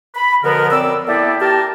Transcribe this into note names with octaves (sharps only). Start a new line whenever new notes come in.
B5
B2 D3 F3 B3 A#4
F#2 C4 D5 E6
A3 B3 E4 G4 A4 D5
G4 A#4 A5